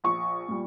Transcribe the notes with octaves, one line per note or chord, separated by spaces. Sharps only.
A#1 C#6
A#2 G3